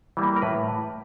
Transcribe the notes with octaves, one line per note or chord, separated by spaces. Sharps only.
E3 G3 A#3
A#4
A2 B4